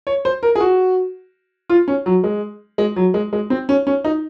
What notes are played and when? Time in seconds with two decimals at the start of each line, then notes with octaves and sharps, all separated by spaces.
0.07 C#5
0.25 C5
0.43 A#4
0.55 G#4
0.60 F#4
1.70 F4
1.88 C#4
2.06 F#3
2.24 G#3
2.78 G#3
2.96 F#3
3.14 G#3
3.33 G#3
3.50 C4
3.69 C#4
3.87 C#4
4.04 D#4